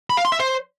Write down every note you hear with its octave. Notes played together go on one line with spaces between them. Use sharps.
B5
F5
C6
E5
C5